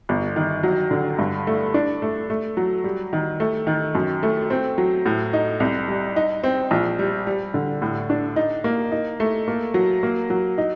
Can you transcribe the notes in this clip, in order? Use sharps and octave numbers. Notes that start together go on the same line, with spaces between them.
G1
D#3
F#3
D3
G2
A3
D4
A3
A3
F#3
G3
D#3
A3
D#3
F#2
A3
C4
F#3
A2
D#4
C2
G3
D#4
C4
A#1
G3
G3
D3
A2
D4
D#4
A#3
D#4
A3
A#3
F#3
A#3
F#3
D#4